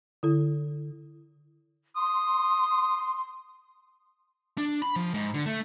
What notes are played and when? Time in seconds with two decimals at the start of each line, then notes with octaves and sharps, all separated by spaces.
0.23 D3 E4 A4
1.96 C6 D#6
4.58 D4
4.82 B5
4.96 F3
5.14 G#2
5.34 D3
5.46 A3